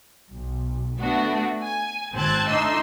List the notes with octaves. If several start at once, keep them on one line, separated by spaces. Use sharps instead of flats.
B1
A3 B3 D4 F#4
G#5
G#1 C4 A5 F#6 G#6
A3 D4 D#4 D#5 C6 E6